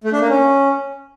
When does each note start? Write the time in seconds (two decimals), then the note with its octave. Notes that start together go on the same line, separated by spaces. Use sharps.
0.04 A3
0.12 D4
0.21 A#3
0.29 C#4